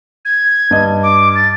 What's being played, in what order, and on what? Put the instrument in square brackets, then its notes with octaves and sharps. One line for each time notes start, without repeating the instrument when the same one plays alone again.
[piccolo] G#6
[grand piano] G2 D#5
[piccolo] D6
A6